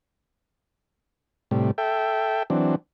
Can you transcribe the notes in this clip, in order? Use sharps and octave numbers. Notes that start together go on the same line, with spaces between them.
A2 C3 G3
A4 E5 G5
E3 F#3 C4 D4